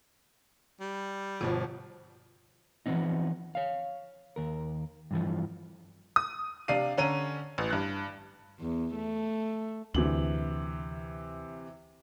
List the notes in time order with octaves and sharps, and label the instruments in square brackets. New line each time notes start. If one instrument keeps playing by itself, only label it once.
[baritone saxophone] G3
[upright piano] G1 B2 F3
[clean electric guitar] E3 F3 G3 B3 C4 D#4
C#5 F5
D#2 A#4
G2 E3 F3
[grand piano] D#6
C3 D4 F5 C7 D#7
D3 C#4 A#5 D#7
A1
G2 F#6
[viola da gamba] E2
A3
[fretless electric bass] D2 [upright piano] C3 E3 F#7